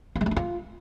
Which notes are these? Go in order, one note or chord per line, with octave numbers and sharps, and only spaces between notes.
A#3
G#3
A3
D4
F4